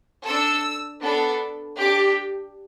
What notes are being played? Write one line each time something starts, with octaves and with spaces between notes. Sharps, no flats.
D4 A4 E6
B3 D4 A4
D4 G4 D6